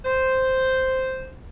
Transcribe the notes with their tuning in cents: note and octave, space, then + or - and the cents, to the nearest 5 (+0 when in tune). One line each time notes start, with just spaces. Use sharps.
C5 -5